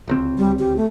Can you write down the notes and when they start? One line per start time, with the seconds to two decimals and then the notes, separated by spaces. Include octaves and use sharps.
0.08 D1 C#2 C4
0.38 G3
0.59 G4
0.77 A3